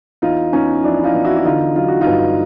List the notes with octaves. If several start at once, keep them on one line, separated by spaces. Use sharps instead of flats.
E2 D#4 F4
E2 C#4 D#4
F3 D4 E4
E4
D#4 F4
E2
E4 F#4
F#4
D3 D#4 F4
F#3 F4
F#4
D#4 F4
G2